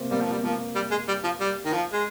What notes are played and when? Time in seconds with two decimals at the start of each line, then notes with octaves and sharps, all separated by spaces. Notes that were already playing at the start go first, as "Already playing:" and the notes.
Already playing: C3 A#3 C4
0.11 G3 A#3
0.21 F3
0.32 G3
0.44 F3 A#3
0.75 G3
0.91 G#3
1.08 G3
1.24 F3
1.40 G3
1.65 D#3
1.73 F3
1.92 G#3